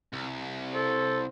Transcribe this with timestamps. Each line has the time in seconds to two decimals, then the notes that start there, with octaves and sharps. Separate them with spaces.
0.13 C2
0.75 A4 C5